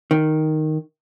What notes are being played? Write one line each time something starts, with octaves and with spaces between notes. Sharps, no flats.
D#3